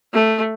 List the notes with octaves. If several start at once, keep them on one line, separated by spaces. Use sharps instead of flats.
A3